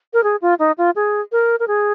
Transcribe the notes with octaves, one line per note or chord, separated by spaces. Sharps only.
A#4
G#4
F4
D#4
F4
G#4
A#4
A#4
G#4